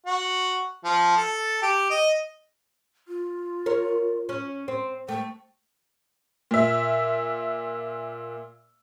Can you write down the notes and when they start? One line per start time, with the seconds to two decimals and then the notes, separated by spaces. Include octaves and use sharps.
0.06 F#4
0.84 F3
1.16 A4
1.62 G4
1.90 D#5
3.08 F4
3.66 A#4 C#5
4.29 C#4
4.68 C4
5.09 A3 G5
6.51 A#2 E5